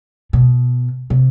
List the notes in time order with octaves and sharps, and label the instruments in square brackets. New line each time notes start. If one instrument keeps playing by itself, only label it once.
[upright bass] B2
C3